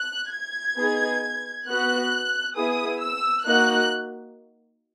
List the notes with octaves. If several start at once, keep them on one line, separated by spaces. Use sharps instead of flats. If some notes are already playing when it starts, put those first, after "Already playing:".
Already playing: F#6
G#6
B3 D#4 G#4
B3 F#4 F#6
B3 E4 G#4 D#6
E6
A#3 D#4 F#4 F#6